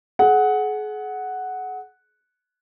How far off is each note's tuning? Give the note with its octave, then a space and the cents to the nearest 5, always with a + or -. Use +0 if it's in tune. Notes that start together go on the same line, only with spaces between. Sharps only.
G#4 +35 F#5 +0